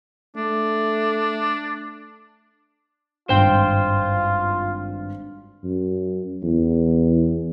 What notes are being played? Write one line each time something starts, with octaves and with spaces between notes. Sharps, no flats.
A3 D4
G#1 G2 F4 C5 G5
F#2
E2